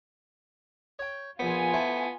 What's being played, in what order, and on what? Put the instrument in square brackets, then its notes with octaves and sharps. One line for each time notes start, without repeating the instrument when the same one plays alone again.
[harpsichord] C#5 G5
[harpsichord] A#1 C5 [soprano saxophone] B3 [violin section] F4 G#5
[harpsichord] A3 E4 C5